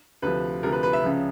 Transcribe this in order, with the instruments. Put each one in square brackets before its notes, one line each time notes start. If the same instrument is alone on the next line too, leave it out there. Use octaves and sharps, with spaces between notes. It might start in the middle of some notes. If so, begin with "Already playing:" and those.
[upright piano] D2 C3 F3 B4
D2 C3 F3 A#4
B4
B4
E5
C#2 C#3 F3